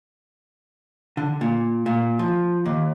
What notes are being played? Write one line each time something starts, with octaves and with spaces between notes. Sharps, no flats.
D3
A#2
A#2
F3
D#2